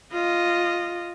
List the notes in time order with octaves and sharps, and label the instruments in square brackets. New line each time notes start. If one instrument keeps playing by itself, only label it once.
[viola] F4 D#5